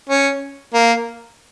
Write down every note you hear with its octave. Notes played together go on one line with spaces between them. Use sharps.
C#4
A#3